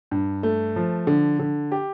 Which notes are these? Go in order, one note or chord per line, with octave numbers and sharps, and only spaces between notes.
G2
A3
F3
D3
D3
G4